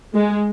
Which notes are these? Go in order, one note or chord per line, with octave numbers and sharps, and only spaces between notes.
G#3